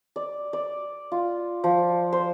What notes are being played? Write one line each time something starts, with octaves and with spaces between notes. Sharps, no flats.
D5
D5
F4
F3
C5